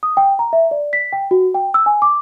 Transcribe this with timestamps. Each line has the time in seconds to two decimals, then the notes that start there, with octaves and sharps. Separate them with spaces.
0.03 D#6
0.17 G5
0.39 A#5
0.53 E5
0.71 D5
0.93 B6
1.13 G5
1.31 F#4
1.54 G5
1.74 E6
1.86 G#5
2.02 D6